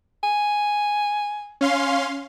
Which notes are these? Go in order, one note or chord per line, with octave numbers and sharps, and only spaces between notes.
G#5
C#4 F5 C6